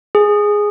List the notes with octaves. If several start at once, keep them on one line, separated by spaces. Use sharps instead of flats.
G#4